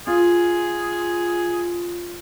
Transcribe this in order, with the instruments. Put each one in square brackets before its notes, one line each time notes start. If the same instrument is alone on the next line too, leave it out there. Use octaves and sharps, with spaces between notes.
[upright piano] F4 [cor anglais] G#4